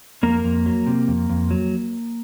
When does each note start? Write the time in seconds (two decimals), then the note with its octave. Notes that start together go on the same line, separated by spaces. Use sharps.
0.23 F2 A#3 A#4
0.44 F2
0.66 F#3
0.87 C3
1.08 F2
1.29 F2
1.50 F#3